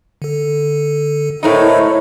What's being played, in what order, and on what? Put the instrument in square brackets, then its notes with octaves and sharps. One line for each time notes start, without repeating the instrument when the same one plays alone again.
[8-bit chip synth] D3 A4
[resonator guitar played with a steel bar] A2 A3 D#4 [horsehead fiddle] E4 C#5 [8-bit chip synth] A#4 C5 D#5